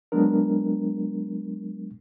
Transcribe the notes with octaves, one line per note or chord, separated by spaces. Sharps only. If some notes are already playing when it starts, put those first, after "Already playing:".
F#3 G#3 B3 D4 A#4